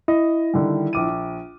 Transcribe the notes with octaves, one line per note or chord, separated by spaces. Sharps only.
E4 D#5
D3 D#3 G3
A#1 D6 D#7